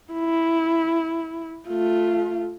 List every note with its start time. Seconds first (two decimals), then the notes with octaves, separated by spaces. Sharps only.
0.13 E4
1.68 A3 F4